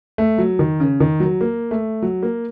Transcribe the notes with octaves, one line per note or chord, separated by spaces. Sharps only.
A3
F#3
D#3
C#3
D#3
F#3
A#3
A3
F#3
A#3